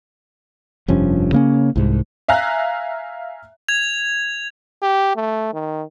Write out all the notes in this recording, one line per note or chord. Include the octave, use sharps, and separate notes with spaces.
F1 G2 F3 C#4
C#3 A#3 C#4
C2 G#2
E5 F5 G#5 A#5 F#6
G#6 F7
G4
A3
D#3